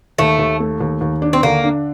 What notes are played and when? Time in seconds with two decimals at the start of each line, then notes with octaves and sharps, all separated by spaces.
0.18 D#2 A3
0.39 D#2
0.60 A3
0.81 D#2
1.01 D#2
1.22 D4
1.33 C4
1.43 D3 A#3
1.64 D4